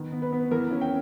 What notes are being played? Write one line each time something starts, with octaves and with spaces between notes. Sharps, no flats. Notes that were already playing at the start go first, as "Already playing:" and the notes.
Already playing: D#3 B3
B3
B4
B3
E3 A#4
C#4
G5